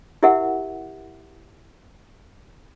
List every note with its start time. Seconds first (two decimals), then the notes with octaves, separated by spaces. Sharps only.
0.23 E4 G4 A#4 E5 F#5